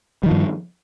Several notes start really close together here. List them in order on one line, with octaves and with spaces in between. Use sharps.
G3 D#3 F3 G2